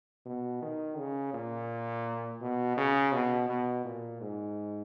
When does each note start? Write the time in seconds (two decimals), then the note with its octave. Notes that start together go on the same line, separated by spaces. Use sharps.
0.25 B2
0.62 D#3
0.98 C#3
1.34 A#2
2.41 B2
2.77 C#3
3.13 B2
3.49 B2
3.85 A#2
4.21 G#2